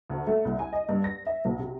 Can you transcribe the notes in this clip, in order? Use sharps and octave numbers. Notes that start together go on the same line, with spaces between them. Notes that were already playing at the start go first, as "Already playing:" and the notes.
D2
A3
C2
G#5
D#5
G2
A#6
E5
B1
C3